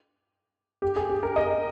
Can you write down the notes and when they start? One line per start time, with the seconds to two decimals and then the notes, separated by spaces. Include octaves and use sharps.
0.82 G4
0.96 G#4
1.10 G4
1.23 A#4
1.36 D#5